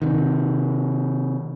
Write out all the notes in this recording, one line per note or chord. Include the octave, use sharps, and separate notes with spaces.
C3 D#3